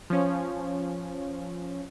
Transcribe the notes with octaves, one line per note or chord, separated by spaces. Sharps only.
F3 C#4